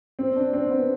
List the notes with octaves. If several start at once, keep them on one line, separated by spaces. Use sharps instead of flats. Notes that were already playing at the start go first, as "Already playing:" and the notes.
C4
D4
C4
B3